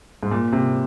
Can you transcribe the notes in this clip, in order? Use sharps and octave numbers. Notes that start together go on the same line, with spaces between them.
G#2
A#2
C3